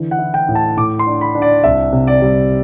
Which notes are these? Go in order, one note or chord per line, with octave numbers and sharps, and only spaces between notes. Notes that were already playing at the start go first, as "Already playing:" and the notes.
Already playing: D3 E3
F#5
E4
G5
A2
A5
A2 D6
C6
D4
B5
D4
D5
C2 E5
C3
D5
G3